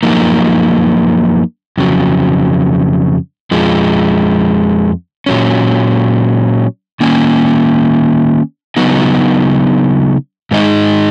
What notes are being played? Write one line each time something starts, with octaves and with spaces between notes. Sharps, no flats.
F#2 F3 A#3 D#4
F2 C#3 F#3
F2 F3 G#3
A#2 F#3 C#4
D#3 A#3 C#4
C#3 F#3 B3 D#4
G#2 D#3 G#3 D#4